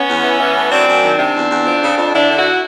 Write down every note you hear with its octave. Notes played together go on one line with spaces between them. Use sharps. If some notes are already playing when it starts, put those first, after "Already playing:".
Already playing: B3 C#4
E2
E3
E3
A2
F#2 C4 D4
F#2
D#3
C3 C4 D4
E2
E2
F2
C#3
F2
D3 D4 E4
D3
E4 F#4